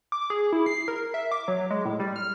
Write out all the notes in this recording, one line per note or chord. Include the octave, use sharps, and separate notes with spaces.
D6
G#4
E4
C7
A#4
E5
D6
F#3
G#3
A2
G3
F6